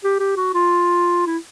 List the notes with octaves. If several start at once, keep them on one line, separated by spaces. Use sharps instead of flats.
G4
G4
F#4
F4
E4